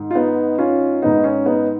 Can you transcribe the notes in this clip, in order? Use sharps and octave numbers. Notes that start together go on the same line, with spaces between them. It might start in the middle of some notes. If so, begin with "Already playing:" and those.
Already playing: G#2 D#3
F4
B3 D#4
C#4 F4
G#2 D#3 B3 D#4
C#4
B3 D#4